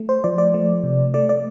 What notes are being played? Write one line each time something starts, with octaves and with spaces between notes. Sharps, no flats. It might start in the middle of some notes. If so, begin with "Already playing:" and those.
Already playing: A3
C5
F3 D5
D5
A3
C3
A3 D5
D5